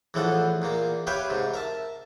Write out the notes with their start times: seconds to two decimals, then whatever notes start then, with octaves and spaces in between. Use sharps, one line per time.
0.14 E2 A2 E3 F3 A4 F#5
0.62 E2 A#2 A#3
1.07 G4 B4 C#5 E5 F5 G5
1.30 G#2 C3
1.54 A#4 E5 A5